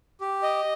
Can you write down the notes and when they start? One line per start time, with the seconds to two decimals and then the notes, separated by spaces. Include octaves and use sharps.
0.21 G4
0.43 D#5